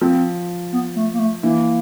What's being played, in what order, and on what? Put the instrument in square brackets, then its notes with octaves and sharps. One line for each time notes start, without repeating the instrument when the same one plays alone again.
[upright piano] F3 [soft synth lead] C4
[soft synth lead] B3
A3
A#3
A3
[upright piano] E3 [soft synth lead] A#3